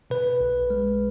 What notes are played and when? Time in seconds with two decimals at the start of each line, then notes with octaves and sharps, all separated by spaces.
0.10 B2 B4
0.40 B1
0.70 G#3